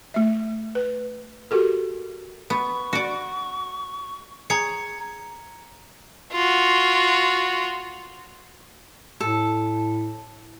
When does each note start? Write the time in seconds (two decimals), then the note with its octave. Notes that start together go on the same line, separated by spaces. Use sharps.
0.14 A3 E5
0.75 B4
1.51 F#4 G4 A4 A#4
2.50 B3 C#6
2.93 F#4 D5
4.50 G#4 C#5 A#5 G#6 C#7
6.32 F4 F#4
9.20 A2 A4